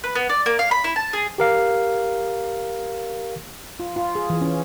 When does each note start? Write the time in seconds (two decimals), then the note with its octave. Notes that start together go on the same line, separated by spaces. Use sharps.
0.04 B4
0.15 B3
0.29 D5
0.46 A#3
0.59 F5
0.71 B5
0.84 E4
0.96 A5
1.13 G#4
1.38 G4 A#4 F5
3.80 F4
3.96 F4
4.15 G#4
4.30 E3
4.41 C#4